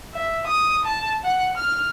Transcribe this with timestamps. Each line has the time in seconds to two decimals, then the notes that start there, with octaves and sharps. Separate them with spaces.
0.14 E5
0.47 D#6
0.85 A5
1.25 F#5
1.57 F6